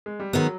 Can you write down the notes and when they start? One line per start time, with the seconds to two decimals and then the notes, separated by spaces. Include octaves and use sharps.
0.06 G#3
0.20 G3
0.33 D#3 F#3 G#3 B3